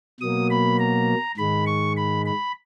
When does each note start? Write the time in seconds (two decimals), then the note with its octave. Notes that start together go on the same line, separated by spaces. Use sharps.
0.20 B2 F#3 A#3 D#6
0.50 B5
0.79 A#5
1.37 G#2 D#3 G#3 B5
1.66 C#6
1.97 B5
2.26 B5